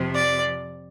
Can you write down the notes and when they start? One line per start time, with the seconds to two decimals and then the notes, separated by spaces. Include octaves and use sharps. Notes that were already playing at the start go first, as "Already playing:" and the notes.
Already playing: F2 C3 F3
0.15 D5